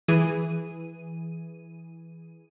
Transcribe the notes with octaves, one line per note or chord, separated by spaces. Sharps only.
E3 G#4 D#7